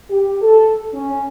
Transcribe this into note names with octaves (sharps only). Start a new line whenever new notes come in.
G4
A4
C#4